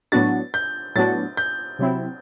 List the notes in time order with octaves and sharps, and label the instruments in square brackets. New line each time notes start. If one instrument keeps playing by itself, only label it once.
[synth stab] A2 F#3 B3 D4 F#4 [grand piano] A6
[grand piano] G6
[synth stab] A2 F#3 B3 D4 F#4 [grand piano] A6
[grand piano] G6
[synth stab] C3 F#3 C4 E4